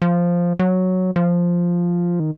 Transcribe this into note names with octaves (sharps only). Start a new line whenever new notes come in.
F3
F#3
F3
D#3